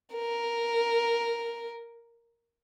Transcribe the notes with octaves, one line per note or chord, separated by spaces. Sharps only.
A#4